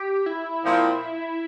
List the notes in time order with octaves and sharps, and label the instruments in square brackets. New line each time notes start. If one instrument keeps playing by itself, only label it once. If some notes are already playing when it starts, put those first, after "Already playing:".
Already playing: [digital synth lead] G4
E4
[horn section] A#2 F3 C4